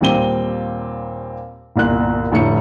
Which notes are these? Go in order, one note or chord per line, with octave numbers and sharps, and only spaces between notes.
D#2 A#2 G3 C4 D#7 G7
G1 C2 A#2 F#6
F1 A2 D3 C#7